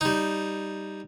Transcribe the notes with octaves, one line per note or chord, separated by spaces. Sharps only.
G3 D#4